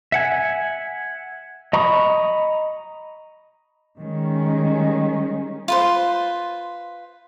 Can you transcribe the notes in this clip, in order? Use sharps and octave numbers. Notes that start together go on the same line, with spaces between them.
E5 F#5 G#5
D#5 A#5 B5 C#6 D#6
D#3 G3 G#3 C#4
F4 B4 C5